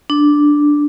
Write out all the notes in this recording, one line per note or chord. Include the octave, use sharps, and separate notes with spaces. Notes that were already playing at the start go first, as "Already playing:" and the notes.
D4